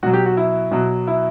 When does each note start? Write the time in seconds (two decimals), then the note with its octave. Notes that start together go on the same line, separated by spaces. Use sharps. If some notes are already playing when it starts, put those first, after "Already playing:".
0.03 B2 F#3 F#4
0.13 G4
0.26 F#4
0.37 E4
0.72 B2 F#3
1.07 E4